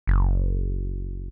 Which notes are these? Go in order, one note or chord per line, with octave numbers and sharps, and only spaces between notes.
F#1